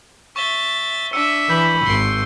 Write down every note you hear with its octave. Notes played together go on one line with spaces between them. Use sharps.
E5 C#6 A6 E7 G7
D4 E5 E6 C#7 D#7
E3 B5 G6
G#1 C6 C#7 D7